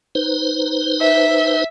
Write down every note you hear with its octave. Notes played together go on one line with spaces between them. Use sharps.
D#4 B4 C5
E5